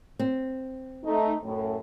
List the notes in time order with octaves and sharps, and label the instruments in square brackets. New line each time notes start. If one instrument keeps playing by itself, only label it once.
[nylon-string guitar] C4
[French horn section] A3 D#4
F#2 A2